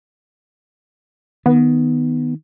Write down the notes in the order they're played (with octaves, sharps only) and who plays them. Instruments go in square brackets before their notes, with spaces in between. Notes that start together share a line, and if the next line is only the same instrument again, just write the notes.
[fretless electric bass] D#3 [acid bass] B3